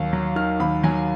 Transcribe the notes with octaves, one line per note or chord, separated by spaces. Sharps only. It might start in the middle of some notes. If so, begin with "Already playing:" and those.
Already playing: D#2 F#3
F#3
D#3 F6
D#2 B5
F#3 G#5